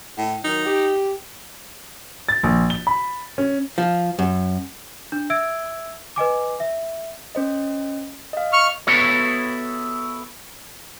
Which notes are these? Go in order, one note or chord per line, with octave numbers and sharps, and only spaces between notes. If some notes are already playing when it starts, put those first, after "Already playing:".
A2
D#3 F#3 D#4
G4
A6
A#1
G7
B5
C#4
F3
F#2
D4
E5 E6 G#6 D7
B4 D#5 G#5 D6
E5
C#4 C5 D#5
D#5 F5
C#6 F6
B3 E4 F#4 A4 C#5